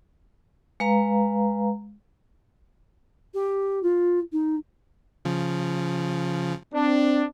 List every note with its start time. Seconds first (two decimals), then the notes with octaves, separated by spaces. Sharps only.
0.80 G#3 B4 F5 A#5
3.34 G4
3.82 F4
4.32 D#4
5.25 C#3 F3
6.74 C4 D4